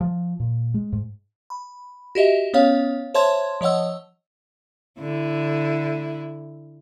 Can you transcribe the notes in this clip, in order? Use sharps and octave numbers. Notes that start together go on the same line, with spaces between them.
F3
A#2
G#3
G#2
B5
F#4 G4 D#5 E5
B3 C#4 C#5 F5
C5 C#5 E5 A5 C6 G#6
F3 C#5 D#5 F#5 E6
D3 E4